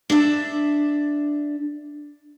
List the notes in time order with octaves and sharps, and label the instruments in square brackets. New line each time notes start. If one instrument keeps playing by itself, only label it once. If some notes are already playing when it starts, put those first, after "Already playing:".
[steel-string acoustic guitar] D4 E5